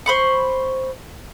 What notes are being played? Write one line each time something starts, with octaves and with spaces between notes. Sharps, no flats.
C5 B5 C#6